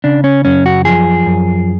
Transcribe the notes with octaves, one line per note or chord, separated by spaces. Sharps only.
C#3 D4
C#4
F#2 C#4
F#4
F3 G#4
F#2